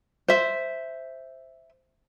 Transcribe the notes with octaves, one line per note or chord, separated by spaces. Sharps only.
C5 E5